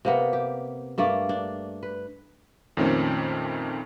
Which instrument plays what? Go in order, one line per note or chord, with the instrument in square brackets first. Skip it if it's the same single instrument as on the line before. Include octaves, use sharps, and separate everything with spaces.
[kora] C3 A#3 B3
G4
G2 A3 A#3 D5
D4
B4
[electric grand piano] F2 A#2 D#3 A3 C4 C#4